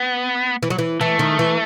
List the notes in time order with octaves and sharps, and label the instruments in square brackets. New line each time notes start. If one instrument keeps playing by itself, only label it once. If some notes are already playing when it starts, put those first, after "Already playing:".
Already playing: [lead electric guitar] B3
[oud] E3
F#3
E3
[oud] E3 [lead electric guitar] A3
[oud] D#3
E3